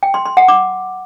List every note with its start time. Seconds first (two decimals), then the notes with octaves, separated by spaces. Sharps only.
0.03 G5
0.14 C6
0.25 C6
0.37 F#5
0.48 D6